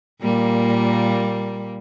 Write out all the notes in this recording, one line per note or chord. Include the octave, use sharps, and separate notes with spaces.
A#2 G3 A#3